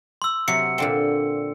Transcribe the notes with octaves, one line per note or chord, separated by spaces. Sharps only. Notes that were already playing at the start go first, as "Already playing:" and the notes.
C6 E6
C3 F#3 C#7
A#2 D3 C4